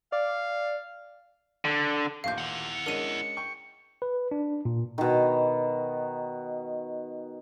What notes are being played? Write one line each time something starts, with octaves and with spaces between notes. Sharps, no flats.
D5 F5
D3
A1 D#2 A#2 F5 G6
E4 F#5
C#7
G#3 C#4 D4 A#4 D#7
G5 C#6
B4
D4
A#2
B2 D#3